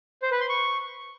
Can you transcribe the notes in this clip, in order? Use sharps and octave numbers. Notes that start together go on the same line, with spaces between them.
C5
B4
C6
C#6